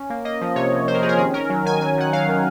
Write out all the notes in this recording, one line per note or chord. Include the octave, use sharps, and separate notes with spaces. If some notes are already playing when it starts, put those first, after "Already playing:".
Already playing: C#4
A#3
A#3 D#5
F3
C3 C#5
C3
C3 C5
A#4
C#4 G#4
A#4
D#3 G#4
C#4 A#4
F#3
D#3 G#5
F#3 G#5
D#3 F#5
F#3 F5
D#3